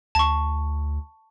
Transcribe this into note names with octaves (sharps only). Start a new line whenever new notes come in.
D2 A5 C#6